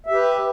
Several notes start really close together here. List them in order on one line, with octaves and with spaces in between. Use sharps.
E5 G4 B4